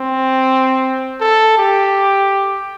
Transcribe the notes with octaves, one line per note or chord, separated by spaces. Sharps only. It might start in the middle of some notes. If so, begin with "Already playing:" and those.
Already playing: C4
A4
G4